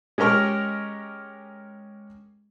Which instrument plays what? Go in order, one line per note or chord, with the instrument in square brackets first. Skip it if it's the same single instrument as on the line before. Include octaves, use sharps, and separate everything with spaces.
[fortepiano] G#3 C#4 G4 A#4 C#6 F6